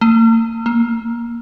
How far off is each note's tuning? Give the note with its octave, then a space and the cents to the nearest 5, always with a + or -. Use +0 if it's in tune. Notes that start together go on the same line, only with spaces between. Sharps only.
A#3 -45
A#3 +15